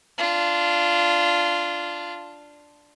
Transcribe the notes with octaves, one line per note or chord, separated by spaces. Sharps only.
D4 F4